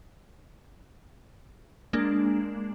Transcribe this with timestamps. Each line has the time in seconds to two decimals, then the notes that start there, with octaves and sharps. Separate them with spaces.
1.93 G#3 A#3 D4